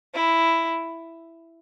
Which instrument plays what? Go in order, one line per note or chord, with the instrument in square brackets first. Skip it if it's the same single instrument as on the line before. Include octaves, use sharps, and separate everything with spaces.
[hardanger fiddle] E4